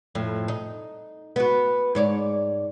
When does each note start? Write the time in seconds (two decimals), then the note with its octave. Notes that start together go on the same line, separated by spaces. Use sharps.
0.15 F2 A2
0.48 D#4
1.36 B3 F#4
1.95 G#2 C#5 D5